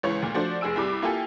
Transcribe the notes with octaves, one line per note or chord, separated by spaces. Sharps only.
C#2 E3 C#5 C#6
D2 A#2
F3 A3 D4 F#4 C5 D5
F1 G#4 G#5 E6 D7
C2 G3 B5 D6
A#3 E4 F4 G4 A4 G#5